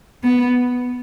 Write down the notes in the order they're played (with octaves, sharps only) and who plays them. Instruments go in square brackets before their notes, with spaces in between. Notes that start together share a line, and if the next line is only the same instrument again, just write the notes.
[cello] B3